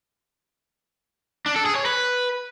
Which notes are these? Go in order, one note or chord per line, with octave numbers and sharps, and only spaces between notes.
D4
A4
G#4
C#5
B4